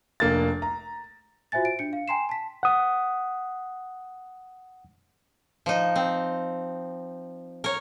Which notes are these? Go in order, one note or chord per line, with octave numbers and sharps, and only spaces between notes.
F1 A#3 D4 A6
A#5
F4 F#4 C5 E5 G#5 A6
D7
D4 C#7
F5
G5 G#5 A#5 C6 C7 E7
A5 B6
F#5 D#6
F3 D#4
C4
A#4 C#5